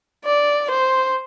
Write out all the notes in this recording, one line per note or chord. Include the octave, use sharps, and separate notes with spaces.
D5
C5